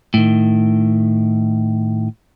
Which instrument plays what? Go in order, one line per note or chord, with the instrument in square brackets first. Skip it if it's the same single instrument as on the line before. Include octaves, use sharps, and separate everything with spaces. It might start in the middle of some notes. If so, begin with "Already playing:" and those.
[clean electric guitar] A2 D#3